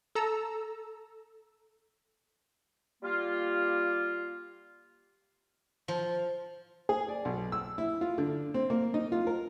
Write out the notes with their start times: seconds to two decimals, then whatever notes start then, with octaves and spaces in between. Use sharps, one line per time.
0.15 A4 A#5 E6
3.03 G3 A#3 F4
5.88 F3
6.89 G#4
7.08 D5
7.25 B1
7.52 E6
7.78 E4
8.01 F4
8.18 D3
8.54 C4
8.70 A#3
8.94 D#4
9.12 F4
9.27 A#4